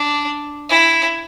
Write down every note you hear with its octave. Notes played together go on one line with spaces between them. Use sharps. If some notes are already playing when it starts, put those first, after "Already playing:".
Already playing: D4
E4